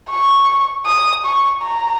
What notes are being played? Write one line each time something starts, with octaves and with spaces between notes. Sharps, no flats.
C#6
D#6
C#6
A#5